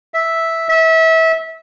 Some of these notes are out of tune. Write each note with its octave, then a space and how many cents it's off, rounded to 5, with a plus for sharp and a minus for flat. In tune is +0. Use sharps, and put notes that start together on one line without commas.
E5 -5
E5 -25